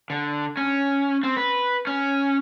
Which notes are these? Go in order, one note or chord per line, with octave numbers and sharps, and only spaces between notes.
D3
C#4
C4
B4
C#4